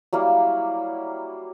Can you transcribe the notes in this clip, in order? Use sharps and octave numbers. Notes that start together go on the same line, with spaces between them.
F#3 G3 A#3 E4